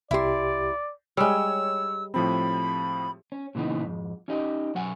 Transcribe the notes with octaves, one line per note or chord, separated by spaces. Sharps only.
C2 E4 G4 D5 C6
G3 G#3 C#5 E6
A2 F3 C4 B5
C#4
A#2 C#3 E3 B3 D#4
F2 G#2
C#4 D#4 G4 D#5
B1 F#3 F#5 G#5